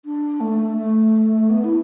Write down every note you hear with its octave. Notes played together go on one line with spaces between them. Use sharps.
D4
A3
A3
B3
E4